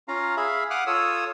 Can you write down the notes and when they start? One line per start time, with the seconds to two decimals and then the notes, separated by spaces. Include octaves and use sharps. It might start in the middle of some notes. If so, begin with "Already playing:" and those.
0.08 C#4 F4 F5 A#5
0.37 G#4 E5 F5 B5
0.70 F5 F#5 D6 D#6 F6 F#6
0.87 F4 A4 C#5 D#6 E6